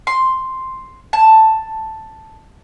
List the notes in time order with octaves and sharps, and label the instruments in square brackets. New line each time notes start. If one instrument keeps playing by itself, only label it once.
[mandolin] C6
A5